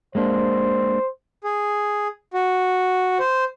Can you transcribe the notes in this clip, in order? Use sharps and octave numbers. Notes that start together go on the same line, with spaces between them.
G#3 A#3 D4 C5
G#4
F#4
C5